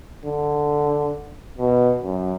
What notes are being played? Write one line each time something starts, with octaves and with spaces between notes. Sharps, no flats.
D3
B2
F#2